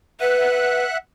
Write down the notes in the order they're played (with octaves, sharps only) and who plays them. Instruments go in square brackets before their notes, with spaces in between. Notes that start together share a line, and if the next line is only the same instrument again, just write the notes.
[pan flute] B4 [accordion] E5 F#5 F#6